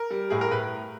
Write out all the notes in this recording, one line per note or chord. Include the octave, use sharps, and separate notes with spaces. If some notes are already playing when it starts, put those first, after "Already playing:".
Already playing: A#4
G3
A2 G#4
A#4
A2 B4